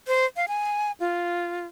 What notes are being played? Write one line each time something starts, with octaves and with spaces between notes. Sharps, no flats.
C5
F5
G#5
F4